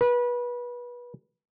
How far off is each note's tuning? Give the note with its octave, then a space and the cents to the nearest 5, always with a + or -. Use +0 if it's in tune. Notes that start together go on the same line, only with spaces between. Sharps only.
B4 -25